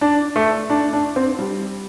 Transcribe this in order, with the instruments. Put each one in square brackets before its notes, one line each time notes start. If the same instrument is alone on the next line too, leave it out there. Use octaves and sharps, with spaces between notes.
[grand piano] D4
A3
D4
D4
C4
G3